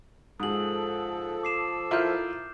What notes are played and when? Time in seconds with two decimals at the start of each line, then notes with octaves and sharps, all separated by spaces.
0.40 G#2 F3 G#4 A4 D#6 F#7
1.43 D6 C7 E7
1.91 E4 F4 A#4 F6 G6